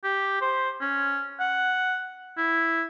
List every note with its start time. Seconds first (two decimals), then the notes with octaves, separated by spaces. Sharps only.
0.04 G4
0.41 C5
0.81 C#4
1.40 F#5
2.38 E4